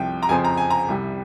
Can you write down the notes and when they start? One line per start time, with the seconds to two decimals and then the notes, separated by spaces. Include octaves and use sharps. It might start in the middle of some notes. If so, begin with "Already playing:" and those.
Already playing: C2 C3 F3 G5
0.23 A#5
0.29 F2 C#3 F3 C4 G#5
0.44 A#5
0.57 G#5
0.70 A#5
0.88 C2 C3 G3